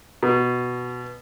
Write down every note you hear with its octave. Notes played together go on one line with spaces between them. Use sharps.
B2